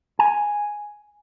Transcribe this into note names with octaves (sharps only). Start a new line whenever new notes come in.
G#5